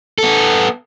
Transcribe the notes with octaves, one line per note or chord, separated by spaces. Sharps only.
B3 A4